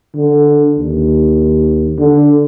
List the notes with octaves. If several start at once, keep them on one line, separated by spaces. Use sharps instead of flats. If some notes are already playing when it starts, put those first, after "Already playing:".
D3
D#2
D3